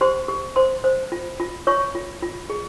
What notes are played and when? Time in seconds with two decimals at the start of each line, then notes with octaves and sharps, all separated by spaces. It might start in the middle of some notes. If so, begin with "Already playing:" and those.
0.01 G4 C5 C6
0.28 G4
0.56 C5 C6
0.84 C5
1.12 F4
1.40 F4
1.67 F4 C#5 C#6
1.95 F4
2.22 F4
2.50 G#4